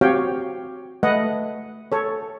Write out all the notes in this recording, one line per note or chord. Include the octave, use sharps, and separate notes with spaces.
C4 F#4 G4 C#5 F5 G5
A3 B4 D#5 F#5
A4 C#5